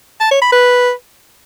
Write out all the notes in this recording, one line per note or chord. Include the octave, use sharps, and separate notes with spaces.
A5
C#5
B5
B4